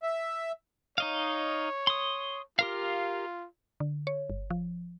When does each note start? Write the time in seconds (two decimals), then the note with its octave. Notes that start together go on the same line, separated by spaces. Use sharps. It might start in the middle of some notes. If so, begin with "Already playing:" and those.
0.03 E5
0.98 D#4 C#5 D#5 F5
1.87 C6 D#6
2.59 F4 G4 A#4 F5
3.80 D3
4.07 C#5
4.30 G1
4.51 F3